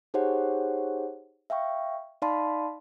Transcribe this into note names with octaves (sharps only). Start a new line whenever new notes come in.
D#4 G4 G#4 C5 C#5 F#5
E5 F5 G5 C#6
D#4 D5 F5 A5 B5 C6